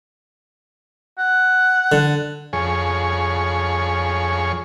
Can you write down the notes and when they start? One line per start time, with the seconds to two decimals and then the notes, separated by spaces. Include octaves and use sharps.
1.18 F#5
1.92 D3
2.53 F2 G#4 C#5